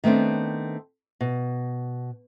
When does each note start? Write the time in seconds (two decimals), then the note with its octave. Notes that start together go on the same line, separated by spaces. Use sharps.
0.04 D#3 A3 B3 C4 D4
1.21 B2